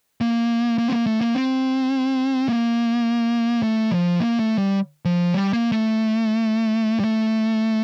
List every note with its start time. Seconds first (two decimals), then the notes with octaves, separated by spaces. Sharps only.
0.21 A#3
0.78 A#3
0.88 C4
0.92 A#3
1.06 A3
1.21 A#3
1.35 C4
2.48 A#3
3.63 A3
3.91 F3
4.20 A#3
4.39 A3
4.58 G3
5.05 F3
5.34 G3
5.53 A#3
5.72 A3
7.00 G3
7.04 A3